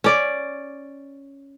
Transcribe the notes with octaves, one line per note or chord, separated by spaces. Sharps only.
C#4 D5